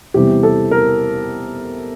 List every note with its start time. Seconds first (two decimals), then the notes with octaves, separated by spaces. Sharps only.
0.14 E2 C3 E3 G3 G4
0.43 A4
0.71 A#4